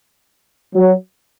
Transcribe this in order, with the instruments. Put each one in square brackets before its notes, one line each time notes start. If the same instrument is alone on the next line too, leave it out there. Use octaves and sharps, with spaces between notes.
[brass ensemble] F#3